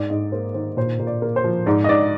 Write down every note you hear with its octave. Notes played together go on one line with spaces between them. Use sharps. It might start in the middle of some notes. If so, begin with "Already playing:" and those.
Already playing: G#2 D5
G#2 D#5
A#3 C5
D#3 C5
A#2 C5
A#2
D5
A#3
C5
F3
G#2 D5
D#5
G#2 D5